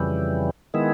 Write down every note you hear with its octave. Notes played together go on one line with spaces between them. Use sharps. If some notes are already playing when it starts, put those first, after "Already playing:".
Already playing: F2 C#3 E3 G3
D#3 G#3 B3 E4